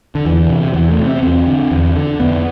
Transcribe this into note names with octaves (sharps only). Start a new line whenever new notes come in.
D3
E2 E3
C3
E2 E3
A3
C3
C4
E2 C4
D3
E2
D3
F2 B3